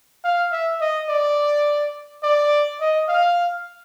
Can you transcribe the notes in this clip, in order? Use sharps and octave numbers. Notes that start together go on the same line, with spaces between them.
F5
E5
D#5
D5
D5
D#5
F5